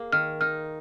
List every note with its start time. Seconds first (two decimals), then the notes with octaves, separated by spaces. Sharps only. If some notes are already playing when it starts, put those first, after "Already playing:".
Already playing: A#3 G#4
0.13 D#3 F6
0.41 D#4 F6